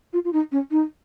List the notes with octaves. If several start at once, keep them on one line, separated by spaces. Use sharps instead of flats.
F4
F4
D#4
C#4
D#4